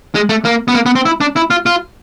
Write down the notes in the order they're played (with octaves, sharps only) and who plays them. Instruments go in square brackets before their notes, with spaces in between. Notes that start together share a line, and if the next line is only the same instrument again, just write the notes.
[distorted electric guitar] G#3
A3
A#3
B3
A#3
B3
C4
E4
D4
E4
F4
F4